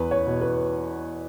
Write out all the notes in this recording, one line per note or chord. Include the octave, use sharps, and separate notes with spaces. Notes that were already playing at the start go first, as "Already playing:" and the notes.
Already playing: E2 B4
C#5
B2
B4